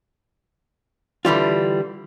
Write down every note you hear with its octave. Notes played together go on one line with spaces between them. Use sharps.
D3 E3 G3 F4